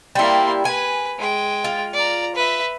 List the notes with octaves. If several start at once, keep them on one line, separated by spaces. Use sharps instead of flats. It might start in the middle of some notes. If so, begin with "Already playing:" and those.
G3 A#3 E4 C6
B4 G#5
G#3 G5
F4
D5 A#5
B4 E5